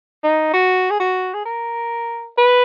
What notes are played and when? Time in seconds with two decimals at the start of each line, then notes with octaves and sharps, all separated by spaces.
0.24 D#4
0.53 F#4
0.90 G#4
1.00 F#4
1.34 G#4
1.45 A#4
2.38 B4